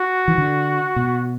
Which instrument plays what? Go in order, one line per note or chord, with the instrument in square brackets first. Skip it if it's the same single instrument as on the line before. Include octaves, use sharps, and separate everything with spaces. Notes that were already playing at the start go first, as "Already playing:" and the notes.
Already playing: [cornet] F#4
[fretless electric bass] E3
D3
B2